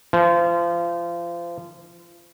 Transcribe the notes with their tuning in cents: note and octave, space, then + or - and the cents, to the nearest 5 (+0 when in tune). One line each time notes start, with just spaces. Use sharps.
F3 -30